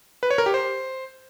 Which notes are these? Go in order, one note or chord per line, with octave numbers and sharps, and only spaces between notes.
B4
C#5
A#4
G4
C5